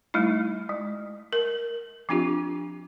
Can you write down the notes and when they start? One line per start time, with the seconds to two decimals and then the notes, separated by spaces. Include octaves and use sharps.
0.14 G3 A3 D#4 E4
0.69 G#3
1.33 A#4
2.09 F3 C4 D4 F4 G4